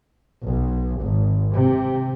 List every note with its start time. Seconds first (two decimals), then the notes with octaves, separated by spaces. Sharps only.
0.47 B1
1.01 G#1
1.54 C3